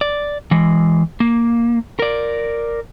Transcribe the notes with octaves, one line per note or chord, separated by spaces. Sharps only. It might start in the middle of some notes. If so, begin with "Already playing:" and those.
D5
E3 G#3
A#3
A#4 D5